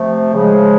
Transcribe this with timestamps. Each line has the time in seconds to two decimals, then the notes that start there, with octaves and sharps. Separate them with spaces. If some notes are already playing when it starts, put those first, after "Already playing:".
Already playing: C3 F3 A3
0.33 C#3 F3 G#3